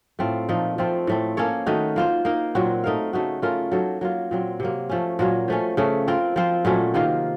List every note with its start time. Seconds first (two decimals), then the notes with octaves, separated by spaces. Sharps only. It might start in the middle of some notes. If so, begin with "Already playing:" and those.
0.19 A2 A3 C4 F4
0.49 A#2 F3 A3 D#4
0.78 F3 A3 C4 F4
1.07 A2 A3 C4
1.37 A#3 C#4 A4 C#5
1.66 D#3 A3 D#4 F#4
1.96 A#3 F4 C5
2.25 A#3 D#4 A#4
2.55 A#2 F#3 C4 F#4
2.84 A3 D#4 A#4 F5
3.13 C#3 A3 D#4 F#4
3.42 A3 C#4 F4 A#4
3.72 F#3 A#3 D#4 A4
4.01 F#3 A#3 F4
4.31 A#2 F#3 C4
4.60 C3 F#3 A#3
4.89 F3 A3 C#4
5.19 A#2 F#3 A#3 C#4
5.48 F3 A3 C#4
5.77 C#3 A3 C#4
6.08 C4 F4 A#4
6.36 F3 C4 F4 C5
6.65 A#2 F#3 A3 C#4
6.94 C3 D#3 A#3 F4